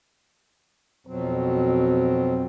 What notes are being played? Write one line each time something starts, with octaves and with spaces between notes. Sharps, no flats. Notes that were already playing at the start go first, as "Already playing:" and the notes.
F2 B2 F#3 C4